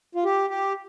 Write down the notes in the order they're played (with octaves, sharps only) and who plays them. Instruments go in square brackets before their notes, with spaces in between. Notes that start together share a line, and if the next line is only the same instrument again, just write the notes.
[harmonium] F4
G4
G4